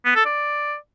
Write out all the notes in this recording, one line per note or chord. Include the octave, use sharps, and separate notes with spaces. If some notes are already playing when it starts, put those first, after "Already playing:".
B3
A4
D5